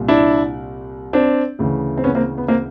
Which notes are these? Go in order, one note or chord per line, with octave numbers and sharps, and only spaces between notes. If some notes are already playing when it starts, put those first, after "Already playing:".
Already playing: C2 A#2
D4 E4
C4 D4
D2 C#3 E3
C4
B3 C#4
A#3 C4
B3
A#3 C4